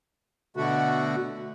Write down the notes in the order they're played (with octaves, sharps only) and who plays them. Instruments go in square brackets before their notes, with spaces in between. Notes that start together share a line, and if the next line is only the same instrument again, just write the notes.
[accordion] B2 D3 A3 F#4